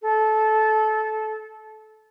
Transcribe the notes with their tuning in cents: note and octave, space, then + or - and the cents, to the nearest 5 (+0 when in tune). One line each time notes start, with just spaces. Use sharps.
A4 -20